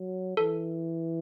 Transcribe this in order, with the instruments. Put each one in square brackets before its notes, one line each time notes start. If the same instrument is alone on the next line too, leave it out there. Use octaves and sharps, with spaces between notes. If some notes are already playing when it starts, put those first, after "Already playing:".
Already playing: [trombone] F#3
[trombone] E3 [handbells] A4